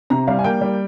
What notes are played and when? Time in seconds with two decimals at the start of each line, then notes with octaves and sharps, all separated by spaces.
0.10 C3 A#5
0.27 G3 F5
0.39 G#5
0.44 A#3 G5
0.61 G3